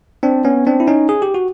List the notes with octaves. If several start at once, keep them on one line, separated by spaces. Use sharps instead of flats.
C4 D4
B3 C#4
C4 D4
E4
C#4 D#4
G#4
G4
F#4